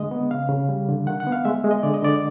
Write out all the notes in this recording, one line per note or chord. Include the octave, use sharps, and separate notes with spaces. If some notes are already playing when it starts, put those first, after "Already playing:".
Already playing: D3 G#3 D#5
B3
C#3 F5
C#3
G3
D3
D#3 F#5
F#5
B3
F5
G#3 E5
G#3
D#5
D3 D5
D#5
D3 D5